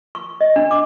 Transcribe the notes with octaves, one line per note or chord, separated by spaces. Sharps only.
C#6
D#5
D4
D6